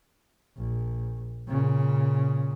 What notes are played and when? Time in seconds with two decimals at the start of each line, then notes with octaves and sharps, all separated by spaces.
0.57 A#1
1.48 A#2 C#3